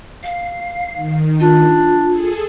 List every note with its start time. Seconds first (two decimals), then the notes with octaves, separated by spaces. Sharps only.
0.23 F5 C7
0.95 D#3
1.40 D4 F4
2.07 G#4 A4